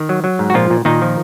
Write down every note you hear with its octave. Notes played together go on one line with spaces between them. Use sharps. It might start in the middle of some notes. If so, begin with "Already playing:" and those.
Already playing: D#3
F#3
F#3
G#2
F#4
A#2 F3 F4
A#2
A#2 D#3 D#4
F3